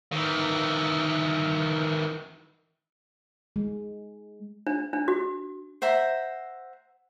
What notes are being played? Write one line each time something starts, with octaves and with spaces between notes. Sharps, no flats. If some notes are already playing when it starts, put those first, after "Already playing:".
D#3 E3
G#3
D4
D4
F#4
C5 E5 F#5 A#5